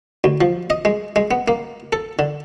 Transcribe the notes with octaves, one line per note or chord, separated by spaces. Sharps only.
D2
F3
D#5
G#3
G#3
B3
A#3
A4
D3